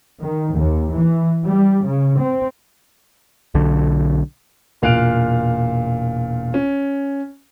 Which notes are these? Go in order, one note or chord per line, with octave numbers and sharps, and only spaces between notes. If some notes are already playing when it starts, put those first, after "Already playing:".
D#3
D#2
E3
G3
C#3
C4
B1 D3
E1 A#2 F5 F#6 D7 F7
C#4